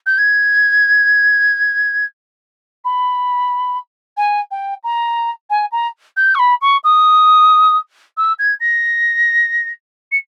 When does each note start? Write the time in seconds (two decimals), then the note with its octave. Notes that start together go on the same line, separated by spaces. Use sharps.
0.06 G6
0.18 G#6
2.85 B5
4.17 G#5
4.51 G5
4.84 A#5
5.50 G#5
5.72 A#5
6.17 G6
6.35 C#6
6.39 B5
6.62 C#6
6.84 D#6
8.17 E6
8.39 G#6
8.60 A#6
10.12 C#7